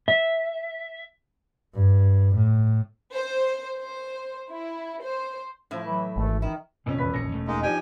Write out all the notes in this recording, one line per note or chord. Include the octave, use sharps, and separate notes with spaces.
E5
G2
A2
C5
C5
E4
C5
A2 F3 E4
E3 F#3
G#1 E3 A3
D#3 E4
C2 F2 A#2 D3 C#4
E1 B4 B6
A#1 D#2 A#6 C#7
E1 A3
G#3 A#3 D#4
F3 D4 D#4 G4 G5 G#5